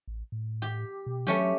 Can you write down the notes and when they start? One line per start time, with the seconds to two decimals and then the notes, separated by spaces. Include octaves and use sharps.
0.08 A1
0.32 A2
0.62 G4
1.06 B2
1.27 F#3 A3 C#4 G4